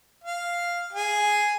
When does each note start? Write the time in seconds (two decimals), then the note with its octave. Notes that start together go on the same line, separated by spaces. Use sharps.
0.24 F5
0.93 G#4